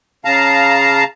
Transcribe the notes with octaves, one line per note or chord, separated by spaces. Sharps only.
C#3 F5 A5 A#5